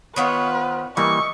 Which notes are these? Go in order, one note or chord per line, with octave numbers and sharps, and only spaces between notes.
D#3 B3 F4 B4 C#5
C5
E3 G3 A#3 D#5 E5 C#6